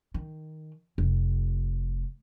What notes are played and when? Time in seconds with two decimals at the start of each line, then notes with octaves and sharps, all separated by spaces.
0.14 D#3
0.98 F1